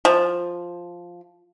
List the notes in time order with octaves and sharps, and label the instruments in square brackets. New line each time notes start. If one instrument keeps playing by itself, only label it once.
[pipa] F3